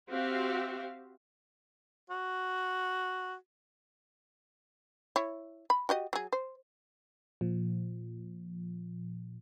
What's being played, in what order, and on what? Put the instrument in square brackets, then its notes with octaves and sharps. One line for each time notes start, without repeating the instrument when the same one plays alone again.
[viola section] C4 F#4 G4 E5 F5
[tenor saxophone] F#4
[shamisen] E4 C#5
B5
F#4 G4 D#5
F#3 G#4
C5
[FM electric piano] A#2 F3